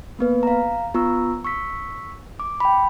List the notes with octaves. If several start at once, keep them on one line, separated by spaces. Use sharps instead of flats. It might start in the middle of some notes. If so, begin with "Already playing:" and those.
A#3 B3 B4
F5 A#5
B3 F4 A#5 C#6 E6
C#6 E6 B6
D6
G5 B5